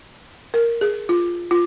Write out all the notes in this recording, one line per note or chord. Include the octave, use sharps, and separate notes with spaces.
A#4
G#4
F4
F4